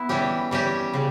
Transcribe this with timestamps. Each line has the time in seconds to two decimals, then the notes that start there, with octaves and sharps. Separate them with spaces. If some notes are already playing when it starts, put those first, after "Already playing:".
Already playing: B3 E4
0.09 E3 G3 C#4 G4
0.51 E3 G3 C#4 G4
0.93 C#3 G3